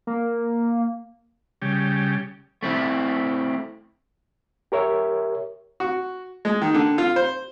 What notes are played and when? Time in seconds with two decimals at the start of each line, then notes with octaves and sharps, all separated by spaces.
0.07 A#3
1.62 C#3 G3
2.63 A3 C4 E4
4.72 G4 A#4 C#5 E5
5.80 F#4
6.45 G#3
6.62 D#3
6.74 D3
6.98 F4
7.16 C5